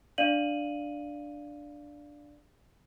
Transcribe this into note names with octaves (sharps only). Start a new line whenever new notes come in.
D4 D5 F5 D#7 F#7